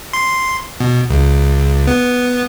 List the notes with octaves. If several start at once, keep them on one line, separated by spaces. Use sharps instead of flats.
C6
B2
C#2
B3